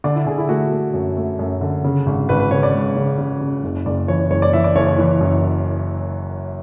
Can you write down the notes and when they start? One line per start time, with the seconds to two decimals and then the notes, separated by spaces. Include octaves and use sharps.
0.04 D3 D5
0.16 E4
0.26 D3 G#4
0.38 E4
0.49 A3 F#4
0.72 A3
0.94 F#2
1.17 A3
1.39 F#2
1.61 D3
1.84 C#3
2.06 G#1
2.29 G#1 B4
2.40 B4
2.51 C#3 C#5
2.63 D5
2.74 G#3
2.96 C#3
3.18 C#3
3.41 C#3
3.64 F#1
3.86 F#1 D5
4.08 E3 C#5
4.31 F#1 C#5
4.42 D5
4.53 E3 E5
4.64 D5
4.76 F#1 C#5
4.87 C#5
4.98 E3
5.21 F#2